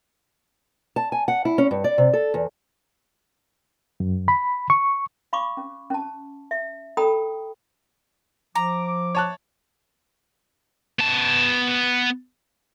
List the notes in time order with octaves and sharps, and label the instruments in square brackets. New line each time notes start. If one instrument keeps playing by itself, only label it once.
[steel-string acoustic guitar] A5
G#5
F#5
E4
C#4
G2
D5
C3
A4
E2
[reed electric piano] F#2
B5
C#6
[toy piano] F5 B5 C#6 D6
C#4
C#4 A5
E5
A4 G5 A#5 B5 D#6
[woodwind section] F3 D6 [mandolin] A#5
[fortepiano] C#5 A5 F#6
[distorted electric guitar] B3 A5